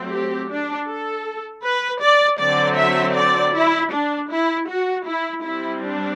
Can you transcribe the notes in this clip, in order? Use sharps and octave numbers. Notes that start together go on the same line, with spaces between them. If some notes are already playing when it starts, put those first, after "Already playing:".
Already playing: F#3 A3 C4
G4
D4
A4
B4
D5
D3 F#3 C4 D5
E5
D5
E4
D4
E4
F#4
E4
G3 C4 E4
D4